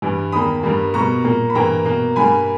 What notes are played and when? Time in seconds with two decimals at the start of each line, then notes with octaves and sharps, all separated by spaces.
0.02 G2 E3 G3
0.32 E2 D#3 A#3 B5 D#6
0.63 G2 G3 A#3
0.94 B2 G3 A#3 A#5 C#6
1.24 A#2 A#3
1.50 B5
1.55 G2 E3 A#3 G5 A#5
1.86 B2 A#3
2.16 G2 G3 A#3 G#5 B5